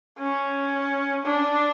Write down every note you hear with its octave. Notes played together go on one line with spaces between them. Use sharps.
C#4
D4